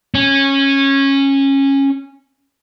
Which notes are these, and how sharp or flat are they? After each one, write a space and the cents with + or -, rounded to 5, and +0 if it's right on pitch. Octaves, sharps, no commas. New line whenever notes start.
C#4 -15